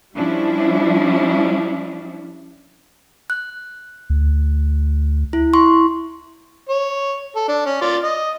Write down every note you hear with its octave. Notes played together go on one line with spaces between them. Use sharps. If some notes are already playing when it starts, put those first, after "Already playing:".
F3 G3 C#4 D4 E4
F#6
D2
E4
E4 C6 C#6
C#5
A4
D4
C#4
F4 D5
D#5